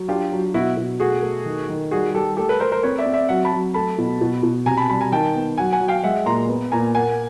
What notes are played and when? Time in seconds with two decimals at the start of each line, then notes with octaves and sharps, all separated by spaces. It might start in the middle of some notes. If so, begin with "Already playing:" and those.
Already playing: F#3
0.08 D4 F4 G4
0.32 F#3
0.54 B2 E4 F#4
0.77 B2
1.00 A3 F#4 G#4
1.22 A3
1.45 D#3
1.69 D#3
1.91 G3 F#4 G#4
2.14 G3 G4 A4
2.37 A3 G4 A4
2.49 A4 B4
2.60 A3 A#4 C5
2.72 A#4 C5
2.83 C4 B4 C#5
2.98 D5 E5
3.05 C4
3.14 D5 E5
3.29 F#3 E5 F#5
3.45 A5 B5
3.52 F#3
3.74 A3 A5 B5
3.98 B2
4.21 B2
4.43 B2
4.66 C3 G#5 A#5
4.77 A5 B5
4.89 G3 A5 B5
5.01 G#5 A#5
5.12 D#3 G5 A5
5.35 B3
5.58 F#3 F#5 G#5
5.72 F#5 G#5
5.80 F#3
5.88 F5 G5
6.04 G#3 E5 F#5
6.26 A#2 A#5 C6
6.49 B3
6.72 A#2 G#5 A#5
6.95 A#3 F#5 G#5